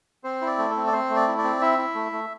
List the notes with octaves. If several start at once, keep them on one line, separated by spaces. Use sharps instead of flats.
C4 C5
E4
D5
A3
A4
C4
D5
C4 C5
A3
D5
E4
D5
C4
E4 E5
E4
A3
A3